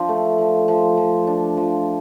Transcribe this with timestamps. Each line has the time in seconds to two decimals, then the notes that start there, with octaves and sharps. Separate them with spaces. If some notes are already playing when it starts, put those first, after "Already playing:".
Already playing: F3 D4
0.09 A3
0.38 F3
0.68 F3
0.97 F3
1.27 D4
1.57 F3